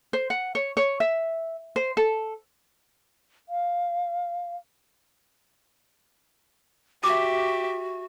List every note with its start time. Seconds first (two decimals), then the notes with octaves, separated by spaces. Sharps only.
0.13 C5
0.30 F#5
0.55 C#5
0.77 C#5
1.00 E5
1.76 C5
1.97 A4
3.49 F5
7.04 F#4 G4 E5 D6